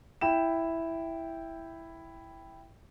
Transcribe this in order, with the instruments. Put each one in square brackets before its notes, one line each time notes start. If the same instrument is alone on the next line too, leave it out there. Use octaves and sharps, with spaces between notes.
[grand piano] E4 G5 E7